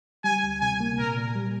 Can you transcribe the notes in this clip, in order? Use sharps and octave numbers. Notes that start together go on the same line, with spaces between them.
G3 G#5
D2
C3 G#5
A#3
A#2 A#4
A#2
G3